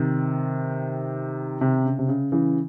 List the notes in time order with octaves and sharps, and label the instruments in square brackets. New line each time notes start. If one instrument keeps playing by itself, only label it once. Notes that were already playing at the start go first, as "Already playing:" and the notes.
Already playing: [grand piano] C3 D#3
C3
C#3
C3
C#3
C#3 E3